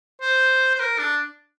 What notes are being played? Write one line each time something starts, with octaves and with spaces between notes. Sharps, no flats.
C5
C5
A#4
D4